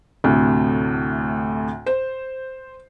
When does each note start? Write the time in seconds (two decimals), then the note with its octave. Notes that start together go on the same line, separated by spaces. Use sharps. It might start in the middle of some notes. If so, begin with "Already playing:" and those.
0.24 D2 A2 C3
1.86 C5